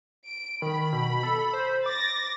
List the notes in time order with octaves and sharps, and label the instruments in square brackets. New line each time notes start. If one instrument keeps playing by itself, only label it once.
[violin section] D7
[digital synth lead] D#3 [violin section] B5
[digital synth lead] B2
A4
C5
[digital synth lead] D6 [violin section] A6 A#6